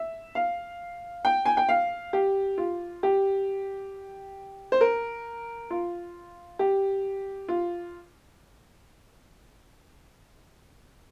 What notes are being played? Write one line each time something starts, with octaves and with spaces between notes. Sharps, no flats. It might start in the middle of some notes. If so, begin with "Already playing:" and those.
Already playing: E5
F5
G5
G#5
G5
F5
G4
F4
G4
C5
A#4
F4
G4
F4